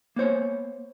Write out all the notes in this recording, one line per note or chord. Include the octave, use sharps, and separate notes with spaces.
A#3 B3 C5 C#5